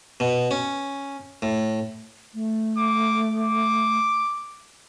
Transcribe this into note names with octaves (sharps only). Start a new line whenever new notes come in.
B2
C#4
A2
A3
D6
D6